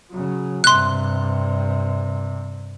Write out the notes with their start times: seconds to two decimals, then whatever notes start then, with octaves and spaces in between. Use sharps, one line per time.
0.11 C#3 F#3
0.64 G2 C3 C6 F#6